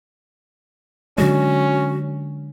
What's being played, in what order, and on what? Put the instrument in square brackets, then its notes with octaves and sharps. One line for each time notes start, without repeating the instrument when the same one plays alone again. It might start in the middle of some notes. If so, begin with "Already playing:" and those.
[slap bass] D3 F#3 G#3 [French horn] C#4 [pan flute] F#4